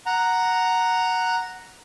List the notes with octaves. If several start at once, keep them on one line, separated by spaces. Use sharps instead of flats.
F#5 A#5